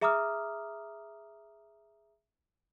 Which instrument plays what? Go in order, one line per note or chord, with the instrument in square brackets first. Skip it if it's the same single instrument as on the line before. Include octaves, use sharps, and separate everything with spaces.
[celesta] G#4 E5 A#5 D6 D#6 F6